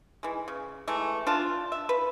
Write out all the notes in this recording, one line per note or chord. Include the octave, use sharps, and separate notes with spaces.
E3 G#3
C#3
E3 G#3 A3
D4 F4 A5
E5
B4